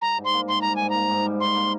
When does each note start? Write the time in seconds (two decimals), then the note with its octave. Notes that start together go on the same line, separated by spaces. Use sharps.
0.02 G3 A#5
0.18 G#2
0.25 C6
0.33 A#3
0.48 G#2 C6
0.62 G3 A#5
0.76 G#2 G#5
0.90 A#3 A#5
1.10 G#2
1.25 G3
1.40 G#2 C6
1.56 A#3